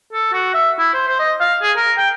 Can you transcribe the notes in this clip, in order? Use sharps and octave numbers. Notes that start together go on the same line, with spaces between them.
A4
F#4
E5
E4
C5
C5
D#5
F5
G#4
A#4
G5